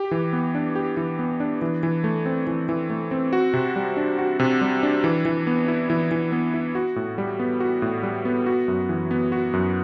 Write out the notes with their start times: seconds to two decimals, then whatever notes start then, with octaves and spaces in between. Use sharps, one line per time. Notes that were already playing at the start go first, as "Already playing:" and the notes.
Already playing: G4
0.11 E3
0.33 B3
0.55 D4
0.76 G4
0.97 E3
1.19 B3
1.40 D4
1.62 E3
1.83 E3
2.04 A3
2.26 C4
2.47 E3
2.69 E3
2.90 A3
3.11 C4
3.33 F#4
3.54 C3
3.76 G3
3.97 D4
4.18 F#4
4.39 C3
4.61 G3
4.83 D4
5.04 E3
5.25 E3
5.47 B3
5.68 E4
5.90 E3
6.11 E3
6.32 B3
6.54 E4
6.75 F#4
6.96 A2
7.18 G3
7.39 B3
7.60 F#4
7.82 A2
8.03 G3
8.25 B3
8.46 F#4
8.68 F#2
8.89 E3
9.11 B3
9.32 F#4
9.53 F#2